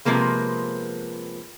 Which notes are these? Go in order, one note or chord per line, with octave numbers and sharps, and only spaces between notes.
C3 F3 G#3 A#3 B3